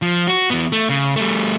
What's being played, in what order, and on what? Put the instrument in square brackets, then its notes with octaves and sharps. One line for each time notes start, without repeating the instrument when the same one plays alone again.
[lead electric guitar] F3
F#4
E2 B3
A3
C#3
G3 A3